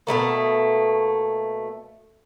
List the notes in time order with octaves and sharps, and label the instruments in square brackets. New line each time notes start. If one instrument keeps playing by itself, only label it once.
[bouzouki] B2 G3 A3 A#3